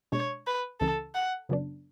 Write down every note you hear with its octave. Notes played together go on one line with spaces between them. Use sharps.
B2 G#3 D4 C#5
B4
C#2 C#3 E3 A4
F#5
F#2 C#3 F#3 B3 D4